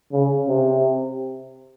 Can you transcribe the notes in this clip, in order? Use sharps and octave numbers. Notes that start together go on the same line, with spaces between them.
C#3
C3